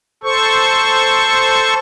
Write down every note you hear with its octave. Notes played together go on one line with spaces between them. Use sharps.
A4 C5 C#6